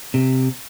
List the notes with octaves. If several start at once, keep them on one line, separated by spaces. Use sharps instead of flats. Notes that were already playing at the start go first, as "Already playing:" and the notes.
C3